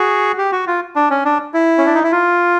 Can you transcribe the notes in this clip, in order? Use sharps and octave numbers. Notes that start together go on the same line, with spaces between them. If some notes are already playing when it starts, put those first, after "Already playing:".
Already playing: F#4 G#4
G4
F#4
F4
D4
C#4
D4
E4
C#4
D4
D#4
E4
F4